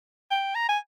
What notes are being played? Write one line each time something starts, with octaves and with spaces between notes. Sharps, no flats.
G5
A#5
G#5